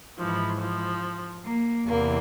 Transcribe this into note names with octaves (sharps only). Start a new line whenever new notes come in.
G#2 E3 F3
F3
A#3
E2 C3 E3 A#3